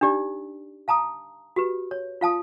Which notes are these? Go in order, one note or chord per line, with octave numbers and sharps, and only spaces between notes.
D4 D#4 G4 D5
F5 A5 A#5 D#6
F#4 G4 B4
C#5
F4 F5 A5 D#6